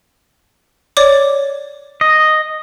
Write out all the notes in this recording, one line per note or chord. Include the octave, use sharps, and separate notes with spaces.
C#5 D5 D6
D#5